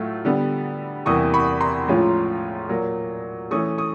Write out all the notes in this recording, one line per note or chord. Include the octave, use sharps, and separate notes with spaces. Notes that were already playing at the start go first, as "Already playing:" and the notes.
Already playing: A2 F#3 A3 F4
D3 G3 B3
E2 C3 E3 G3 A#3 C#6 D#6
B5 C#6
A#5 C6
A2 F3 G#3 C#4 F4
A#2 F#3 A#3
E3 A3 C#4 C#6 D#6
C#6 D#6